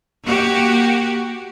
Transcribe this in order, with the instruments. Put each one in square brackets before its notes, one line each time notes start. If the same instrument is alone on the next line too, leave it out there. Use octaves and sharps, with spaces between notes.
[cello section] A#3 F#4 G4